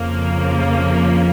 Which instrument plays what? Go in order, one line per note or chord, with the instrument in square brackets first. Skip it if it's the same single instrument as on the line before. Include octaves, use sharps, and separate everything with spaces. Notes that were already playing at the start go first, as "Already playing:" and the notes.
Already playing: [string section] F2 C#3 F3 A#3